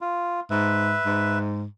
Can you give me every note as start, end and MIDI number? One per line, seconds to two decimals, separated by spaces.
0.01 0.40 65
0.50 0.96 44
0.50 1.38 71
0.50 1.38 76
1.06 1.65 44